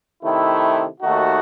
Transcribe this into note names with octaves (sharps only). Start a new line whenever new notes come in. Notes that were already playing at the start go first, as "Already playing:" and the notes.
C3 D#3 A3 E4
D#2 D#3 A3 D#4 F#4